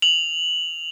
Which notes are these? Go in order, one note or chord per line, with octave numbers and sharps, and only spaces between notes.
F7 F#7